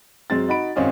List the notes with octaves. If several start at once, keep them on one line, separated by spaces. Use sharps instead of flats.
F#2 G#3 C4 A6
D#4 F#4 B5 D7
G#1 C4 C#4 D#5 F5